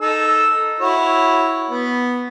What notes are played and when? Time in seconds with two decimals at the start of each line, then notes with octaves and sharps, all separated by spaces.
0.01 D#4 A4 E6
0.80 E4 F#4 C#5
1.70 B3